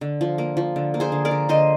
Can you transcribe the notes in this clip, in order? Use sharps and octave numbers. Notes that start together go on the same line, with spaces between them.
D3
F3
A#3
F3
D3
A#3
G#4 C5
D3
A#4 D5
D3
D3 C5 D#5